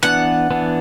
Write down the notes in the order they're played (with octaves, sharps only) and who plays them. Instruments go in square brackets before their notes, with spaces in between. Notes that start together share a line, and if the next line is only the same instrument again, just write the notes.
[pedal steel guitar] E3 B3 D4 [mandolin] F#5
[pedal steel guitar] E3 B3 D4